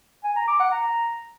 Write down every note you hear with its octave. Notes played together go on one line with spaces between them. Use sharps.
G#5
A#5
D6
F#5
A#5